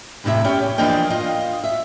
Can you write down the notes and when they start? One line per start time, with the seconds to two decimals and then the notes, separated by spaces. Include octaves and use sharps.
0.24 E2 A2 C3 E4 E5
0.45 C#4 G4 C#5
0.78 E3 F3 A#3 D4 D#5 G5
1.10 F4 D#5
1.64 E5